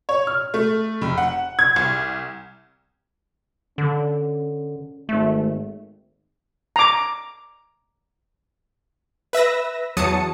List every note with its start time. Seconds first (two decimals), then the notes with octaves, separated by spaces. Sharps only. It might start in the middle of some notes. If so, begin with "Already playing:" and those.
0.09 C#5
0.27 F6
0.54 A3
1.02 F1
1.18 F#5
1.59 G#6
1.76 C2
3.78 D3 C#4
5.09 G#1 A3
6.76 A#5 D6
9.33 B4 E5 E6 A#6
9.97 E2 F#3 A5 D#6 C#7